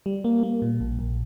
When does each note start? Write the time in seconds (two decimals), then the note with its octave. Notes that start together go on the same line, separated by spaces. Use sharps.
0.06 G3
0.24 A#3
0.43 A#3
0.62 A#2
0.80 A#1
0.99 A#1